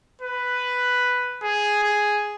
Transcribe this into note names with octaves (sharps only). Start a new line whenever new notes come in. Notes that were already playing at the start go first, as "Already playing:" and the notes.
B4
G#4
G#4